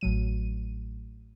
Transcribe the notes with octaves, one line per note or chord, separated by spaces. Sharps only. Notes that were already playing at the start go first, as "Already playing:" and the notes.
A1 A2 F#3 D#7